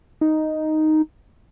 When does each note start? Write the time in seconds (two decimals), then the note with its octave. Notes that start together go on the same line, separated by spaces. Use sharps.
0.21 D#4